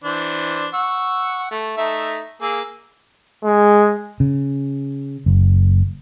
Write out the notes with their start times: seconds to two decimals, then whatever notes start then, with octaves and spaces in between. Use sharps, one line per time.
0.04 E3 D4 C5
0.74 F#5 C#6 E6
1.51 A3
1.77 A3 D#4 E5
2.42 A#3 G#4 E6
3.44 G#3
4.20 C#3
5.26 F#1